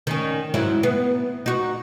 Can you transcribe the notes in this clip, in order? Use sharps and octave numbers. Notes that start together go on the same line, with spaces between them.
D#3 C#4
G#2 F#3 E4
B3
D#4 F#4